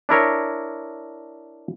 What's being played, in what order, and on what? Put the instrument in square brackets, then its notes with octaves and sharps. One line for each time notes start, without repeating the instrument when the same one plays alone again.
[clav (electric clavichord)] D4 E4 A#4 C#5